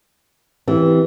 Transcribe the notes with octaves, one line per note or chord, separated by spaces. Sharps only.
E3 C4 G4